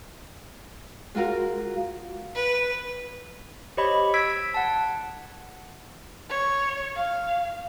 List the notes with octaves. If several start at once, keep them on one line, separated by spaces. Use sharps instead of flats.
G#3 F4 F#4 A#4 F5
B4
G4 C5 C#5 D#5 B5
E6 G#6 B6 D7
F#5 A5
C#5
F5